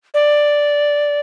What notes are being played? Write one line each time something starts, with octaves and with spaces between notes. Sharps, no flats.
D5